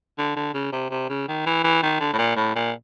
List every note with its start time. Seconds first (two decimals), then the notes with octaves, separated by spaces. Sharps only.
0.18 D3
0.36 D3
0.54 C#3
0.72 C3
0.90 C3
1.09 C#3
1.28 D#3
1.46 E3
1.64 E3
1.83 D#3
2.00 D3
2.13 A2
2.18 A#2
2.37 A2
2.55 A#2